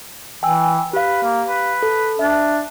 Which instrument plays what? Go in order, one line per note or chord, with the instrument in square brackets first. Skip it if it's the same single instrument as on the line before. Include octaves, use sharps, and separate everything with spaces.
[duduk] E3 [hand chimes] G5 G#5 E6
[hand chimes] G4 F5 [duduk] B4
[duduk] A#3
B4
[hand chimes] A4
[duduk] D4 [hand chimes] E5